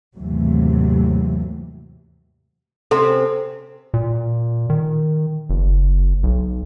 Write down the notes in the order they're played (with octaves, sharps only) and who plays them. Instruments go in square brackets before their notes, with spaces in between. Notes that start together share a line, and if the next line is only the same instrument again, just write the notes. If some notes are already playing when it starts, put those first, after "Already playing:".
[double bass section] D#2 G#2 C3 E3 F#3 A3
[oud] C3 C4 C#4 [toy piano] A4 C6
[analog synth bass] A#2
D#3
F#1
B1